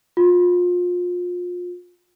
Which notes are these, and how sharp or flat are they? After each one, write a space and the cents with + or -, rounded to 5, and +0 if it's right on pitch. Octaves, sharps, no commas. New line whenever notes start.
F4 +30